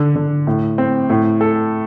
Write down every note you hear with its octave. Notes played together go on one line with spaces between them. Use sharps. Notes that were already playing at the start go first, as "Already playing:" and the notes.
Already playing: D3
D3
A2
C4
A2
A4